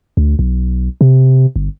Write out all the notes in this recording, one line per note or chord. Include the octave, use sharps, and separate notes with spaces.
D2
B1
C3
G1